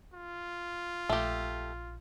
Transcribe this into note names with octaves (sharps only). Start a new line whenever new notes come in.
F4
A#1 A3 G4